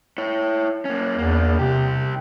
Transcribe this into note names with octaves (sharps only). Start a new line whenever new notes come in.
E4 C#5
A#3 C#4
E2 A#3 D4
C2 C3 G4